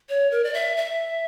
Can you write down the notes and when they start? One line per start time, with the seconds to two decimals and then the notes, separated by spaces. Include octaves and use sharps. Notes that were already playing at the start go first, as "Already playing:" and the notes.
0.09 C#5
0.31 A#4
0.44 D5
0.54 E5
0.77 E5